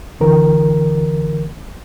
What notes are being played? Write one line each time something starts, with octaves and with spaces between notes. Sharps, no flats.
D2 D3 E3 A#4